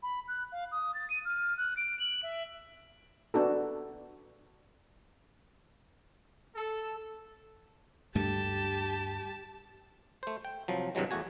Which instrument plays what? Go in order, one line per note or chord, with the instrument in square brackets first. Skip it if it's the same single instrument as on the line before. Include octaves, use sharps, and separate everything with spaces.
[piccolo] B5
F#6
F5
D#6
A6
D#7
F6
F#6
D7
F#7
E5
[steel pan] B3 D4 F#4 A4
[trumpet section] A4
[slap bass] D2 G2 A3 [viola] G4 A5
[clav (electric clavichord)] A3 C5
G5
C2 F3 F#3
G2 C3 E3 F#3 G#3
E2 A3 F#4 G#5